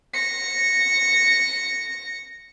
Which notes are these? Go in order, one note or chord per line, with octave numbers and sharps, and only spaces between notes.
A#6 C#7